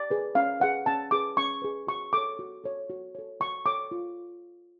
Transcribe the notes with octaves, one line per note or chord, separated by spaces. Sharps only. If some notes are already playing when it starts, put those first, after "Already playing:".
Already playing: D5
G#4 B4
C#4 F5
G#4 B4 F#5
C#4 A5
G#4 B4 D6
C#4 C#6
G#4 B4
F#4 C#6
A4 C#5 D6
F#4
A4 C#5
F#4
A4 C#5
F#4 C#6
A4 C#5 D6
F4